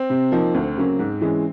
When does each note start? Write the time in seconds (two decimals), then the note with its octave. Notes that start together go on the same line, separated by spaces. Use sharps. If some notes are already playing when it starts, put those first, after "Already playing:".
Already playing: C4
0.10 C3
0.32 F3 A#3 D#4
0.54 D2
0.76 C#3 F#3 A#3 C#4
0.99 G#2
1.21 E3 G#3 C#4